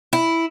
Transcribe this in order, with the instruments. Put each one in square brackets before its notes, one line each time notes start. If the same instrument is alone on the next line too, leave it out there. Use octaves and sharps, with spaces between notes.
[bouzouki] E4